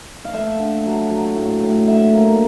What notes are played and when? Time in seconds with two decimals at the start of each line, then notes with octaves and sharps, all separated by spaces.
0.25 F5
0.33 A3 E5
0.59 D3
0.85 F#3
1.10 F#3
1.36 A2
1.62 A2
1.87 D3 E5
2.14 A#3